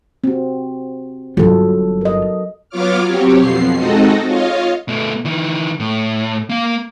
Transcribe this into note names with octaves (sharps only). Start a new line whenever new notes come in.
C4 F#4
G1 F#3 F4 A4
A#4 D#5
F#3 B3 F4 C#5 D6 F6
F#3 C4 G4 C#5
F2 B2 F3 C7
G#3 C4 D#4 F#4 A4 D#5
F4 C#5 D#5 F5
B2 A3
D#3 E3
A2
A#3 F5